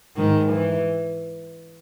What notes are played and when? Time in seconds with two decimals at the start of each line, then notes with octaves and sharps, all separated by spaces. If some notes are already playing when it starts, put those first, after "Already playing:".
0.16 G#2 D#3
0.52 E3